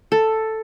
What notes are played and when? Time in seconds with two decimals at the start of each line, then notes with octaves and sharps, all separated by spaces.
0.12 A4